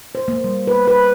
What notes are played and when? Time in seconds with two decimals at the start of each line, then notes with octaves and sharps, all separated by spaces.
0.15 C5
0.28 A#3
0.44 G3
0.67 B4
0.88 B4